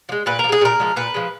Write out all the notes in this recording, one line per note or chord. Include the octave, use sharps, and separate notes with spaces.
F3
G#3
A#2 B4
A#4
F3
G#3 G#4
A#2 A#4
F3 G#3
A#2 B4
F3 G#3